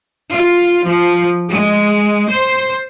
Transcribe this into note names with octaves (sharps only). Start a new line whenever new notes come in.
F4
F3
G#3
C5